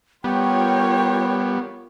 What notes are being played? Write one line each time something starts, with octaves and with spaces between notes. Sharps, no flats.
G3 B3 F4 A#4 C#5 G5